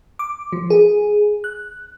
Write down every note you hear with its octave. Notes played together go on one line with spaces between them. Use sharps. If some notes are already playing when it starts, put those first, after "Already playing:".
D6
F3
G#4
F#6